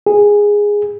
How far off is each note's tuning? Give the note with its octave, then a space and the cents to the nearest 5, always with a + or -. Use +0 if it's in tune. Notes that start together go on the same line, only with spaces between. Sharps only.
G#4 -10